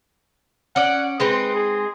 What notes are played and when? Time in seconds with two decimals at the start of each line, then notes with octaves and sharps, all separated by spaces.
0.76 C#4 D5 F#5
1.20 G#3 C4 D#4 B4
1.55 G#4